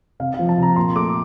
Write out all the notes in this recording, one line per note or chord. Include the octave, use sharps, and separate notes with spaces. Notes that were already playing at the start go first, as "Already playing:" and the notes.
C3 F5
F5
F3
A5
C3 A#5
A#2 C6
A3 D6